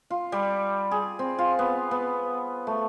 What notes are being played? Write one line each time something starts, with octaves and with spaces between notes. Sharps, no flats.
F4
G3
G#4
C4
F4
B3
B3
A3